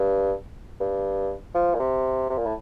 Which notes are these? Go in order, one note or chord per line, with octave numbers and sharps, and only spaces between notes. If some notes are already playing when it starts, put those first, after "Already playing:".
Already playing: G2
G2
F3
A#2
C3
C3
A#2
A2